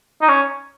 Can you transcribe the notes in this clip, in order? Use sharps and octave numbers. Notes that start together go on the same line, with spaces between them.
D#4
C#4